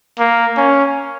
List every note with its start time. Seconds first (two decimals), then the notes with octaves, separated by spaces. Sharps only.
0.19 A#3
0.57 C#4